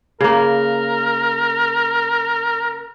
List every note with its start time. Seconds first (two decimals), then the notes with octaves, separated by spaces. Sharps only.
0.21 C#3 A#3 A#4